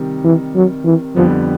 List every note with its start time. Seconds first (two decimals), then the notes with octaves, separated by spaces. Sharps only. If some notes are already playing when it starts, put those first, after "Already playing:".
Already playing: C3 D#3 G3
0.24 E3
0.55 F#3
0.85 E3
1.16 F2 D3 F3 G3 B3